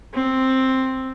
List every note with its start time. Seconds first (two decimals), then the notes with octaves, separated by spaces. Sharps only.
0.14 C4